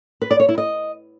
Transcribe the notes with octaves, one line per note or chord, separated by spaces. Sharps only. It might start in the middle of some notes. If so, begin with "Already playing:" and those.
B4
D5
C#5
E4
D#5